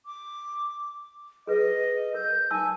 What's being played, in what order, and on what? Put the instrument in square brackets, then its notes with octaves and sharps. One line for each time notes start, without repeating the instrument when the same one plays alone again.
[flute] D6
[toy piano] G#4 B4 [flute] D#5
[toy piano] A#4 [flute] G6
[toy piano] D#4 A5 E6 [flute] G#5